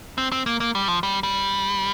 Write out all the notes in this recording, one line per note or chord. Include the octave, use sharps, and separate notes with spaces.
C4
C4
A#3
A#3
G3
F3
G3
G3